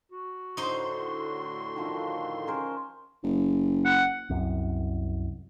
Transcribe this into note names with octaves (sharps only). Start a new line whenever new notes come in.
F#4
A2 D3 D#4 C5 C6
D#3 F3
C#4 A#4 C5
F#1
F#5
C2 F#2